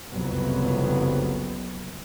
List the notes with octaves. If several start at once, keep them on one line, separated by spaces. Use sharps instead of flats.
F#1 C2 F2 C3 F#3 B3